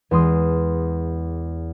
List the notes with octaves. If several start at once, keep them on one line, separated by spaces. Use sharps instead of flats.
E2 G#3 C6 D#6